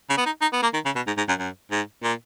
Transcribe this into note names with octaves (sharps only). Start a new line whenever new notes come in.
C#3
B3
D#4
D#4
B3
A#3
D#3
C#3
B2
G#2
G#2
F#2
F#2
G#2
A#2